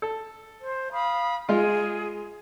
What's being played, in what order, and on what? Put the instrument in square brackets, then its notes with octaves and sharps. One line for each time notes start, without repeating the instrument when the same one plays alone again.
[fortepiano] A4
[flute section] C5
F5 B5 D#6
[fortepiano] G#3 F4 [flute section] G#4